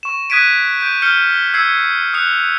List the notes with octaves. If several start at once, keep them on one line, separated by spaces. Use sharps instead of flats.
C#6 E7
D#6 F#6 G#6 B6 D7 D#7
G6 D7
F6 G6 C#7 G7
E6 G#6 C7 C#7
D#6 F#6 C#7 F7